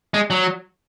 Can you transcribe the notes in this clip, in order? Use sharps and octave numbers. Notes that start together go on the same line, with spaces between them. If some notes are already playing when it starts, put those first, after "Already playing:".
G#3
F#3